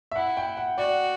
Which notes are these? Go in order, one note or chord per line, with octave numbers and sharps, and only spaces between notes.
E5
E4 F#5
G5
F#5
F#4 D5